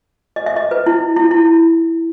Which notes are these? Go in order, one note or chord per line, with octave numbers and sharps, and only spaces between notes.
D#5
E5
D#5
B4
E4
E4
E4